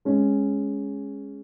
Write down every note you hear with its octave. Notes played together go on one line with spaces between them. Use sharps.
G#3 C#4